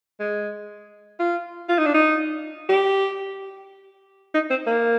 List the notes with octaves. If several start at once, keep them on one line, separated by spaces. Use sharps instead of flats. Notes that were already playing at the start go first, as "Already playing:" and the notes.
G#3
F4
F4
D#4
D4
D#4
G4
D#4
C4
A#3